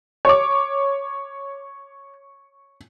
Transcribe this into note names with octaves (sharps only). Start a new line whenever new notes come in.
C#5 D6